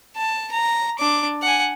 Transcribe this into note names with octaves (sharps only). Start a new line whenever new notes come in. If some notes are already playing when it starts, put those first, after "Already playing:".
A5
A#5
D4 D6
F#5 G#5